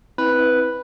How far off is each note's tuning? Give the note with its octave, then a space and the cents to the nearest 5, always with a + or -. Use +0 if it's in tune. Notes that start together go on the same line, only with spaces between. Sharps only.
C4 +0 E4 -30 B4 +0